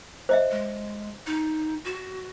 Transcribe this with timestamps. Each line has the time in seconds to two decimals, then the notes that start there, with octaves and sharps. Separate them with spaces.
0.29 C5 D#5 E5
0.51 G#3
1.27 D#4
1.85 F#4